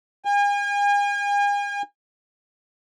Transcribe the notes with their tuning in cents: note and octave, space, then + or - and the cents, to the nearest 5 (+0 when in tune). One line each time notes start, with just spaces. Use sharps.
G#5 -40